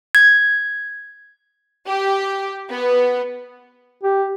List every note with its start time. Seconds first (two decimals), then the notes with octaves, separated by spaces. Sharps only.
0.15 G#6
1.87 G4
2.70 B3
4.04 G4